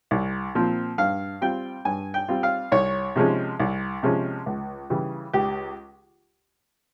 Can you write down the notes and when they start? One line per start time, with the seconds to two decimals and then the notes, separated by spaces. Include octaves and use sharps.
0.11 C2
0.55 A#2 F3 C4
0.98 G2 F5
1.41 G3 C4 F4 G5
1.85 G2 G#5
2.14 G5
2.28 G3 C4 F4
2.43 F5
2.72 C2 C#5
3.16 C3 F3 G#3 C#4
3.60 C2
4.03 C3 F3 G#3 C#4
4.46 C#2
4.90 C#3 E3 G3
5.33 C#2 G4